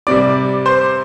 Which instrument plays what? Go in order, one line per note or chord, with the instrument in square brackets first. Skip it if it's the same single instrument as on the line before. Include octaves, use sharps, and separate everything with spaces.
[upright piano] C3 G3 D5 D6
C5 C6